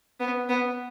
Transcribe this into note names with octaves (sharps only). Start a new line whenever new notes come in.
B3
B3